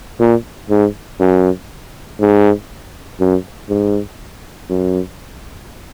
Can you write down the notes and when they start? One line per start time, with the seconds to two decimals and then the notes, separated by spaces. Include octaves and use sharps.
0.20 A#2
0.70 G#2
1.20 F#2
2.20 G#2
3.20 F#2
3.69 G#2
4.70 F#2